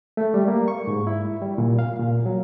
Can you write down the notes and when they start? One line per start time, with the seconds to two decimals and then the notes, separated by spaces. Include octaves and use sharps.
0.17 A3
0.34 G3
0.48 A#3
0.68 C#6
0.87 G#2
1.07 E4
1.42 G3
1.58 A#2
1.79 F5
1.99 A#2
2.26 F#3